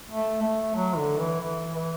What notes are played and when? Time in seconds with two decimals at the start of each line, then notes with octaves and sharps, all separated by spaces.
0.09 A3
0.42 A3
0.75 F#3
0.97 D3
1.20 E3
1.42 E3
1.75 E3